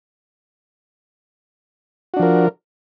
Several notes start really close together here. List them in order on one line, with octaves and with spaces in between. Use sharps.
F#4 D4 F3 A#4